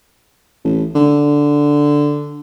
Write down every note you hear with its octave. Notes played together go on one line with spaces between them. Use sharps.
A1
D3